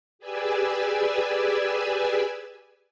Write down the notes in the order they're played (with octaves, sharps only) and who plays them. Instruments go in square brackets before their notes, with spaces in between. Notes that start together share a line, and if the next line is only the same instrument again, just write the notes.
[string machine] G4 G#4 B4 D5 G#5 E6